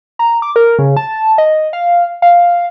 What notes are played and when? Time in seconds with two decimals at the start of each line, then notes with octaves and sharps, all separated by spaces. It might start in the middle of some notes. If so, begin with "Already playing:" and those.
0.19 A#5
0.42 D6
0.56 A#4
0.79 C#3
0.96 A5
1.38 D#5
1.73 F5
2.22 F5